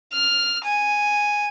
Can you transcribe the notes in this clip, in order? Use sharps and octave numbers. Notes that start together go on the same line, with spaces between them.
F6
G#5